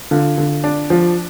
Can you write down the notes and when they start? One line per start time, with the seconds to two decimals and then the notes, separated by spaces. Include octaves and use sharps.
0.11 D3 F4
0.38 D3
0.64 D4
0.90 F3